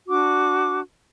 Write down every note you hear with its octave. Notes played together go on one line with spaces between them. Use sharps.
D4 F#4 D6